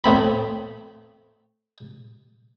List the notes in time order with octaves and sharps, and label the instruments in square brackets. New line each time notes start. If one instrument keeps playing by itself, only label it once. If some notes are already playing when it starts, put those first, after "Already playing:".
[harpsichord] A2 A3 C4 B5